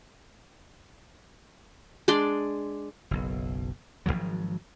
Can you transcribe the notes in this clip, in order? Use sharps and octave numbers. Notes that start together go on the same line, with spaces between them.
G#3 D4 D5 C6
F#1 B1
G#1 E2 F3 F#3